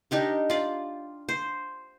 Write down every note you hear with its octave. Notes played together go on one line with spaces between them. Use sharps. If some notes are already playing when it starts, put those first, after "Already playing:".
D4 D#4 G4 A#4
F4 D5
C5